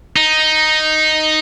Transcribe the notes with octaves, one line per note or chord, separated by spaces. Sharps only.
D#4